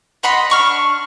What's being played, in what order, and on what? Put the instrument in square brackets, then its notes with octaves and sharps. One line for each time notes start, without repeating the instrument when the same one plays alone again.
[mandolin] D#5 F#5 B5 C6
D4 C#6 F6